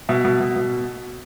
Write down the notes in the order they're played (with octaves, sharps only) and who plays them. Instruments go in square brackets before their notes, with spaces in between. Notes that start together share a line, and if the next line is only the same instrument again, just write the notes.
[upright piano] B2 E5
B2
B2
B2